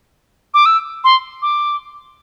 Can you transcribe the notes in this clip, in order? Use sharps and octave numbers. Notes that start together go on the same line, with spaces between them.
D6
E6
C6
D6